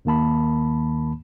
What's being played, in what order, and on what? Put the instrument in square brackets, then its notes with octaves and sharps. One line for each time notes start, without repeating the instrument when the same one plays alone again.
[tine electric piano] D#2 D#3 A#3 A5 B5